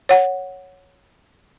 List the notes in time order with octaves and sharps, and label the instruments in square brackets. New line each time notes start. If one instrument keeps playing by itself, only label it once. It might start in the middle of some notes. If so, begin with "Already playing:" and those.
[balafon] C#5 F#5